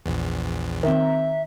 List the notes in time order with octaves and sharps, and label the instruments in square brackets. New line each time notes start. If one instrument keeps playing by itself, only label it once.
[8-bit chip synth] A#1 E2
[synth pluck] D#3 [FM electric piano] C4 A#5 [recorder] E5